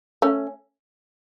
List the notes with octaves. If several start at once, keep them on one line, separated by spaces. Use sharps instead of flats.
A3 C#4